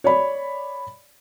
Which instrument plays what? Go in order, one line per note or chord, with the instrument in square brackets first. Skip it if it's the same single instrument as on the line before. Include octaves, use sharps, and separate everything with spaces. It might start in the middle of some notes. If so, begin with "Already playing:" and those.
[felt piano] C#5 D5 B5